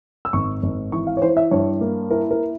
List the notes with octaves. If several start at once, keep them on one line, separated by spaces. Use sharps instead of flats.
E6
G#1 C#6
G#1
E3 C#6
F5
C#5
E3 C5
E5
G2 C#5
A#3
E4 A#4
A#4